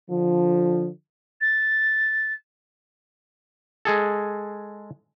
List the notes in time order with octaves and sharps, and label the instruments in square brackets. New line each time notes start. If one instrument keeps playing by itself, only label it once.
[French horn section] D3 F3
[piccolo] A6
[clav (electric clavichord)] G#3 G#4 A4